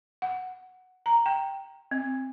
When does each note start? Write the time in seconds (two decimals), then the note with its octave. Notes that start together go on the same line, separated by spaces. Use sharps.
0.22 F#5
1.06 A#5
1.26 G5
1.91 C4